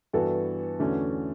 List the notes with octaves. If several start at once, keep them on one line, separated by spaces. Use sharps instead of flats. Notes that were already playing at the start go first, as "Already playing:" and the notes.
G2 E3 B3 F#4 A4
E2 D3 A3 C#4 F#4